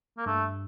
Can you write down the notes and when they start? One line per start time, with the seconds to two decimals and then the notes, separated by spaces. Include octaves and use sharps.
0.18 A#3
0.26 G2 A3